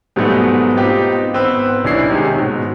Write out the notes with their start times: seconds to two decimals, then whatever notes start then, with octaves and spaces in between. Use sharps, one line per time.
0.16 G#2 B2 F#3 G3 A3 B3
0.77 B3 C4 D#4 F4 G4
1.33 G#1 B3 C4 B4 E6
1.84 B1 C#4 D4 E4 C7
2.09 C3 D#3 G#3 C#4
2.37 G#2 B2